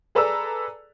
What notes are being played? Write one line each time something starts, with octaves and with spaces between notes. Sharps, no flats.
G#4 A4 B4 D5 A#5 E6